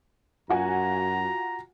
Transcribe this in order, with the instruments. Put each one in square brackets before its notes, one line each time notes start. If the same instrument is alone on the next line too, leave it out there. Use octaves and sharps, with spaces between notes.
[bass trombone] F#2 [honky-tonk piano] F4 F#4 G#5 [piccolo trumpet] A#5